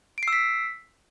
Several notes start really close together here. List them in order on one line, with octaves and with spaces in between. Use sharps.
D7 C7 E6 B6